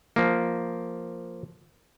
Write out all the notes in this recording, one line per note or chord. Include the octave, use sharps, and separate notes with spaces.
F3 A#3